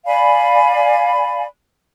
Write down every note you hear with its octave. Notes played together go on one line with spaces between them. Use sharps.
D5 F5 G#5 B5